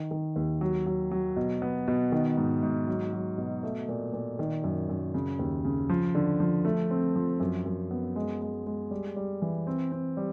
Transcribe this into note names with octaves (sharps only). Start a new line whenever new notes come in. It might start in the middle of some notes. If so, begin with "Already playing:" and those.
Already playing: D#3
D#3
D#2
F#3
F#3
F#3
B2
B3
B2
D#3
G#2
G#2
F#3
F#3
B2
A3
A#2
A#2
D#3
F#2
F#2
C#3
D#2
C#3
F3
D3
F3
A3
C4
F3
F#2
F#2
B3
G#3
G#3
G#3
G3
G3
E3
C4
C4
G3